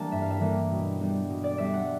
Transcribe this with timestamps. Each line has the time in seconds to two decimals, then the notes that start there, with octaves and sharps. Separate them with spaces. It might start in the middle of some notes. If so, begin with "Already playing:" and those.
Already playing: E3 G3 A#3 D4 A5
0.12 G2 E5
0.22 F5
0.31 E5
0.40 E3 G3 A#3 D4
0.70 B2
1.00 G3 B3 D4
1.30 B2
1.44 D5
1.58 G3 B3 D4 E5
1.74 F#5